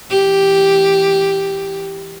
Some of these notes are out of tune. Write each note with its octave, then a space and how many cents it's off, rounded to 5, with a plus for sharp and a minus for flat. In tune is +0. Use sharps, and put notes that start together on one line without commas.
E3 +0 G4 +0